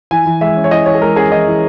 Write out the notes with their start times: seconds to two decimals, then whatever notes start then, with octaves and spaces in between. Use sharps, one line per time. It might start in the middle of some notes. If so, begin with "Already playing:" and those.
0.11 E3 G#5
0.26 E3
0.41 G#3 E5
0.56 C#4
0.64 C#5
0.71 E3 D#5
0.86 E3 C#5
0.95 G#4
1.01 G#3 A#4
1.16 C#4 G#4
1.31 E3 D#5
1.47 E3